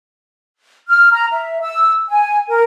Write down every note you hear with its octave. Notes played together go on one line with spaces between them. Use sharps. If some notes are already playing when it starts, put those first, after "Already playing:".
F6
A#5
E5
E6
G#5
A#4